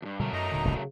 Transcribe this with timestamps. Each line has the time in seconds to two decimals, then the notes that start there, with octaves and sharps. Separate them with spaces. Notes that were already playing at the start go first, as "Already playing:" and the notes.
0.02 E2 G2
0.20 B2 D3 F#3 G3 A3 A#4
0.33 F#2 D#4 D#5 A#5
0.52 D#1 A#2 D3
0.65 F1 C2
0.76 C#3